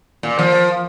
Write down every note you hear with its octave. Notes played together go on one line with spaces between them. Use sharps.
A#2
F3